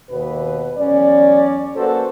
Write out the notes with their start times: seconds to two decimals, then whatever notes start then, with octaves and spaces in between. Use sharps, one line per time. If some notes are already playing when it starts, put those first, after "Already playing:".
0.10 D#2 B2 B4
0.76 E2 F#3 C#4 D5
1.75 A#3 F#4 A4 B4 C5